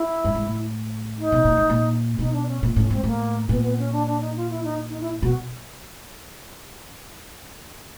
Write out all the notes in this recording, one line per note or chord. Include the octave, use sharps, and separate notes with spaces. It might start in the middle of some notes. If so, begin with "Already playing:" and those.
Already playing: E4
G2
G#2
A2
D#4
B2
A#2
A2
A#2
B2 D#4
D4
C#4
A#2
A2 C#4
G#2 C4
A2 A#3
A#2 B3
B3
C#4
D4
D4
D#4
F4
E4
D#4
D#4
E4
B2 F#4